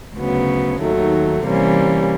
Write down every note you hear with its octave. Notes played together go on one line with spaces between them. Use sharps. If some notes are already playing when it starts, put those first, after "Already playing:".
D2 C#3 F#3 B3
D#2 D#3 F#3 A3
C3 E3 G3 A#3 C#4